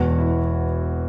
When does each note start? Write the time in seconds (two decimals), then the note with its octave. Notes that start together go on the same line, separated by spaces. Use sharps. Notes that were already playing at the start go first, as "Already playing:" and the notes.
Already playing: E1 E2 B2 F#4
0.18 E4